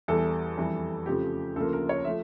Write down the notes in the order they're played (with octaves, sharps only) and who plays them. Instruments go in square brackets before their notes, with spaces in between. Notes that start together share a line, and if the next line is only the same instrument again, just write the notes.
[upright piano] E2 E3 G3 A4
F2 E3 G3
F2 C#3 F3 A3 G4
D2 C#3 F3 A#3 A4
A#4
C#5
F3 A3 E5